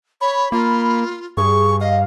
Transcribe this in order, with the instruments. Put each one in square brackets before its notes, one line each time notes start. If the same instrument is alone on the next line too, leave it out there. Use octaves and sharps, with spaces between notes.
[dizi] C#5 [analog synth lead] B5
[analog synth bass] A#3 [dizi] F4
[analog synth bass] G2 [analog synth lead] G#4 [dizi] C#6
[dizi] D#5 [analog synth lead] F5